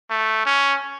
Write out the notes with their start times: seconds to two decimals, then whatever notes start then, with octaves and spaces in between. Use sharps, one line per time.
0.10 A3
0.46 C#4